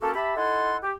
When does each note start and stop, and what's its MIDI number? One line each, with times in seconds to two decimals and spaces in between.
0.01 0.12 58
0.01 0.12 61
0.01 0.12 66
0.01 0.12 67
0.01 0.12 69
0.15 0.35 67
0.15 0.35 76
0.15 0.35 81
0.15 0.35 83
0.36 0.77 63
0.36 0.77 64
0.36 0.77 69
0.36 0.77 78
0.36 0.77 80
0.36 0.77 84
0.84 0.93 67